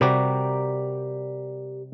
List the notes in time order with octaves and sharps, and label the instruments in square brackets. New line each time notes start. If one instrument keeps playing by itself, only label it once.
[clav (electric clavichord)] C3 G3 F#4 [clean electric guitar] G4 A#4 D5